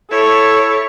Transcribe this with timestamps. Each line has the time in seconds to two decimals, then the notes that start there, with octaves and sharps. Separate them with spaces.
0.11 E4 A4 C#5